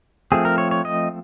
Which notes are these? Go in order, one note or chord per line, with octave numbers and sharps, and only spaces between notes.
F3 A3 C4 G#4
A#4
C#5
C#5
D#5